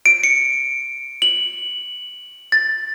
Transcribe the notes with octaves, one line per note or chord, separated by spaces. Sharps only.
D7
C#7
F#7
A6